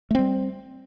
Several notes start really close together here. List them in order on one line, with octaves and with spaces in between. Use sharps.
A3 C4 G3